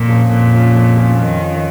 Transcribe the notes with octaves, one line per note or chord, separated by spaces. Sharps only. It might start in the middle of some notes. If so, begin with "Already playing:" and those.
Already playing: F2 A#2
F3 C#4 F4
F2 A#2
F3 C#4 F4
F2
F3 C#4 F4
F2 D#3
F3 C#4 F4